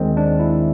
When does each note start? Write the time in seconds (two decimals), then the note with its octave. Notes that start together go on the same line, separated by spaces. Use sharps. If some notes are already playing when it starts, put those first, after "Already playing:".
Already playing: D#2 D#3 G#3 C4
0.17 D4
0.39 E4